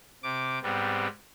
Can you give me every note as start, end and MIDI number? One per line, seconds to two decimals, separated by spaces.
0.23 0.59 48
0.23 0.59 86
0.63 1.07 44
0.63 1.07 55
0.63 1.07 59
0.63 1.07 60